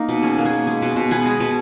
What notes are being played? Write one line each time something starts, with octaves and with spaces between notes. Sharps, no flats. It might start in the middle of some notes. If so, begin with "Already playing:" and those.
Already playing: A#3 D#4
B2
C#4 G#4
A#3
G#4
B2
G#3 G#4
B2
B2
B3 G#4
G#3
B2